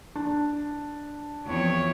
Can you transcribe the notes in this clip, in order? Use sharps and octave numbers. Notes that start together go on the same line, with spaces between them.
D4
E2 F3 C4 C#5